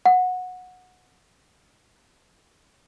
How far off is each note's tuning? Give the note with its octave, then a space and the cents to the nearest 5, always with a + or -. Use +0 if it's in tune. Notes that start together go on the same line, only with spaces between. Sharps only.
F#5 -15